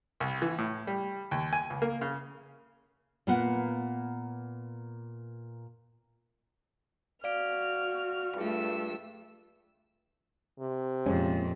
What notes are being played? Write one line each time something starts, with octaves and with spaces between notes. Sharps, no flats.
C2
E3
A2
G3
D#2
G#5
C#2
A#3
C#3
A#2 A#3 B3 B4 F#5
F#4 D5 F5 F6 D7
G2 A3 F4 G#4 E6
C3
F2 A#2 G#3 C#4